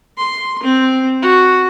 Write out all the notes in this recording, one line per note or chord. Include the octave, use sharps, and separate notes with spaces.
C6
C4
F#4